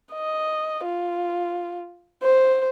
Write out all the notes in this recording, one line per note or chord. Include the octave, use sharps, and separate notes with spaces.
D#5
F4
C5